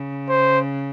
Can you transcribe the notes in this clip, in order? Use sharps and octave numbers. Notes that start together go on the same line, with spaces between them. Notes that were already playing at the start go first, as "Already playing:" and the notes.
Already playing: C#3
C5